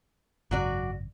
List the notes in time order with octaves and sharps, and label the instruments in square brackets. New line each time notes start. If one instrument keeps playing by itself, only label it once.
[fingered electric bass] G#1 F#2 C#3 [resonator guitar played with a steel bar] F#3 F#4 D5